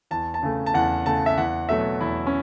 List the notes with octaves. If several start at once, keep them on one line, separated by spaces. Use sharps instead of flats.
E2 A5
A5
C#3 A3
A5
E2 F#5
C#3 A3 A5
E5
E2 F#5
B2 F#3 A3 E5
E2 E4
C#4